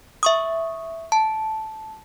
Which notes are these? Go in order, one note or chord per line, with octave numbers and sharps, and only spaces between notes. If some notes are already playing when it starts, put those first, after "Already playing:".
E5 C#6 D#6
A5